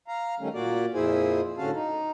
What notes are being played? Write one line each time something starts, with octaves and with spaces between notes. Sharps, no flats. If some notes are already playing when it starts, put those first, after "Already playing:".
F5 A#5
D#3 G3 A3 C#4
A#2 A#3 F#4 D5
F2 A#2 E4 G#4 C5 G#5
A2 D3 C#4 F#4 F5 A5
D#4